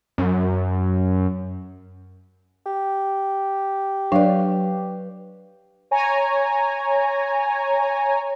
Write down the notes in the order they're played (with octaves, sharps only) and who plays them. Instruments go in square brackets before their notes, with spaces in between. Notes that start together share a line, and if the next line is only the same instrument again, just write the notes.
[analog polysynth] F#2
[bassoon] G4
[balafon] F#3 [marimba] D4 D5 [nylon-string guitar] B4 F5
[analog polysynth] C#5 G#5 A#5